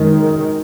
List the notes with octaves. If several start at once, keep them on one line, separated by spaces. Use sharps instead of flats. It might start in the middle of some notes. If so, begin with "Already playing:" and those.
Already playing: F#2 D#3 G#3